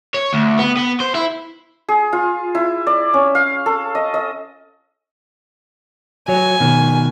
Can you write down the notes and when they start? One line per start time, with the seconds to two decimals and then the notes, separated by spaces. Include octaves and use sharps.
0.14 C#5
0.33 D2
0.59 B3
0.77 B3
1.00 C5
1.15 E4
1.89 G#4
2.13 F4
2.55 E4
2.87 D5
3.14 C#4
3.35 F5
3.66 A4
3.95 D#5
4.14 D#5
6.28 F#3 C#5 G#5
6.60 B2 D#3